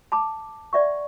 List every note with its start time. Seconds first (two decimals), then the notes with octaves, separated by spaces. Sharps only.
0.12 A5 B5 D6
0.73 D5 E5 F#5 C#6